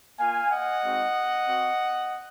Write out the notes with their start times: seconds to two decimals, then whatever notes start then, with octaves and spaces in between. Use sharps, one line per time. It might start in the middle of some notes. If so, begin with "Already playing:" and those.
0.19 A#3 F4 F5 G#5
0.50 D#5 F#5
0.83 G#3 C4 D#4 F#4
1.46 C4 F#4